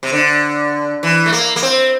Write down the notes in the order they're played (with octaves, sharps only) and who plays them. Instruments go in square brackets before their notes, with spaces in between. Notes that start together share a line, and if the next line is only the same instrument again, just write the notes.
[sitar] C3
D3
E3
A3
A#3
A#3
C4